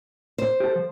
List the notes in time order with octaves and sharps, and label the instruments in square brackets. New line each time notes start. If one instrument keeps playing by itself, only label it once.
[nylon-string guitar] C5
[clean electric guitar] G4 A4
F3